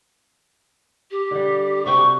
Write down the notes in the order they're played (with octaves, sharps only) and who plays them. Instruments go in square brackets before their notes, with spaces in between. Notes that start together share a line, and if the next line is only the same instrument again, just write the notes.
[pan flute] G4
[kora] D3 G3
[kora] C3 F#4 G5 [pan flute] C#6